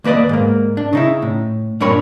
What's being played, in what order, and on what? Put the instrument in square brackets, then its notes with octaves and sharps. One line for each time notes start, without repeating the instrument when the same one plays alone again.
[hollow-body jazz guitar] D#2 A#3 B4 D5 D#5
G#2 A#3
D4
C#3 D#4 E4
A2
G2 A#2 D4 A#4 C#5 B5